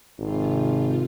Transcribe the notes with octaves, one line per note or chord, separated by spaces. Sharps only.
G#1 C3 F4